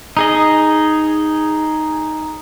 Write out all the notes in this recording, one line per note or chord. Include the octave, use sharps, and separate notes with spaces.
D#4 G#4 D#5